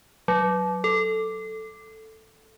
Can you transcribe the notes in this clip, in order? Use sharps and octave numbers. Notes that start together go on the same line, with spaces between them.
F#3
A4